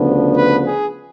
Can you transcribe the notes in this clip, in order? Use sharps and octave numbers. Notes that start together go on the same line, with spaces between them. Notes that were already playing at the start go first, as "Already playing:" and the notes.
Already playing: D2 C#3 F3 B3 D4
B4
G#4